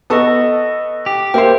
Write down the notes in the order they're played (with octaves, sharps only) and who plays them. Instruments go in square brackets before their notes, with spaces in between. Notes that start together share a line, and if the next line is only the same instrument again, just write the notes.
[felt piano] B3 A4 [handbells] D#5 C#6 D#6
[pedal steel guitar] G4
[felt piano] A#3 C5 [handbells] E5 G5